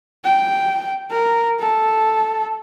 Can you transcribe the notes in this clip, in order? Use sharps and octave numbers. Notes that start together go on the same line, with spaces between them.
G5
A#4
A4